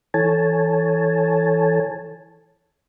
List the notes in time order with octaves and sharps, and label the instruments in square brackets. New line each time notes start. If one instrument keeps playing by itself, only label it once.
[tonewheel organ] E3 A4 C#5 G#5 A5